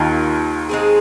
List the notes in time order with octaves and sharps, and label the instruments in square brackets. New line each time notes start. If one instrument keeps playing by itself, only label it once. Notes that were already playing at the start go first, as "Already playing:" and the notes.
Already playing: [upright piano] D#2 D#3 [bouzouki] A#3 F4 A#4
[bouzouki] G#3 C4 G#4